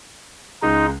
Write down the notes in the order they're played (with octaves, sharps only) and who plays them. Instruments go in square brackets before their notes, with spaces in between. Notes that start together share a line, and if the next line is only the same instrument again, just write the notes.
[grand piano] C#2 G#3 [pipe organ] D#4